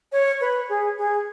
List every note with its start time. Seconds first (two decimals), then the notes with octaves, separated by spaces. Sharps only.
0.12 C#5
0.41 B4
0.69 G#4
0.98 G#4